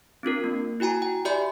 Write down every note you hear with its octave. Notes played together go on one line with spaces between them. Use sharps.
C4 D4 F4 A#4
A#3
E4 F#4 G5 G#5 A#5
G5
G4 D5 E5 G#5 B5 G6